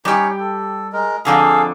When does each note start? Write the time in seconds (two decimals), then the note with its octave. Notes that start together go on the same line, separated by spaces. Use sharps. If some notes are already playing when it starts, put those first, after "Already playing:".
0.05 G3 C#4 D#4 G4 C#5
0.40 A4
0.93 G#3 A#4
1.25 F2 D3 G#4 A4 F5 A#5